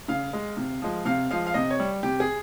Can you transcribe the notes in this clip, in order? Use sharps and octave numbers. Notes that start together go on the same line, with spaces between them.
C#3 F5
G#3
C3
F3 G#3
C3 F5
F3 G#3 F5
F5
C3 D#5
C#5
G3
C3 G4
G#4